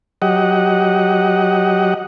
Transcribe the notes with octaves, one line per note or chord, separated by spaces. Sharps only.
F#3 G4 D#5 F#5